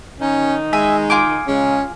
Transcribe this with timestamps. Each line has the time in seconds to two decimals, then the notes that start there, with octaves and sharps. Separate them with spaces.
0.19 D#3 C#4 D#4
0.73 G#3 E5 G#5
1.10 F4 G#4 D6
1.47 C#3 G#3 C#4